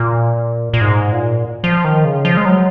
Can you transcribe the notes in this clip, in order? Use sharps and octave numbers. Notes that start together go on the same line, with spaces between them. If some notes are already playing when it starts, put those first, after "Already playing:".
Already playing: A#2
A#2
G#2
A#2
F3
D#3
C#3
F3
G#3
F#3